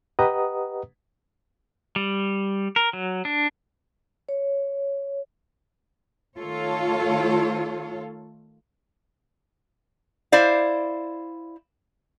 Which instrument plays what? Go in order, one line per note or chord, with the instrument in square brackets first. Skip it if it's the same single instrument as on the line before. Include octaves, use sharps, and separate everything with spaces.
[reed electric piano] G4 B4 D#5 F#5 A#5 D#6
[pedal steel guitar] G3
A#4
F#3
D4
[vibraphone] C#5
[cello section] D#3 A3 F4 A4 C#5
[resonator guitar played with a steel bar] E4 C5 D5 F5